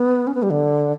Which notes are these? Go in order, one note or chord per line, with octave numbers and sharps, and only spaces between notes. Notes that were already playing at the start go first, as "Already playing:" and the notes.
Already playing: B3
C#4
B3
G3
D3